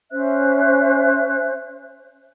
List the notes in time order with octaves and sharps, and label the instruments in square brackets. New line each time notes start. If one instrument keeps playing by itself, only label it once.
[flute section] C#4 C5 E5 F#6